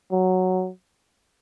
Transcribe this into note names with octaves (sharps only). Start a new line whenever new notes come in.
F#3